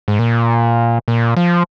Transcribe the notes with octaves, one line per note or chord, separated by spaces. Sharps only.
G#2
A#2
A#2
F3